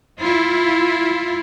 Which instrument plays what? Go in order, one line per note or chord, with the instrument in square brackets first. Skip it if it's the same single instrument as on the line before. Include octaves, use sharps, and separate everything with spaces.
[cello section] E4 F4